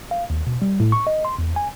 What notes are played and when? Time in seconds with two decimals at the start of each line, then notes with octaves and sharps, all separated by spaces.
0.11 F5
0.30 D#2
0.47 B2
0.62 G3
0.80 A2
0.92 C#6
1.07 D#5
1.25 C6
1.39 E2
1.56 G#5